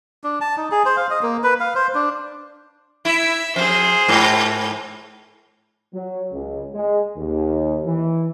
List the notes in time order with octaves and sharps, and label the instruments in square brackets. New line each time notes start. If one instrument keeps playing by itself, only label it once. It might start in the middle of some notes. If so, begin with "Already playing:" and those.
[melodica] D4
A5
D#4
G#4
C5
F5
D#5
A#3
B4
F5
C5
D4
[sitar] E4 [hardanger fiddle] E5
[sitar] F2 [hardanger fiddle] G#4 C5
[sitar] G#2
[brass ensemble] F#3
C#2
G#3
D#2
E3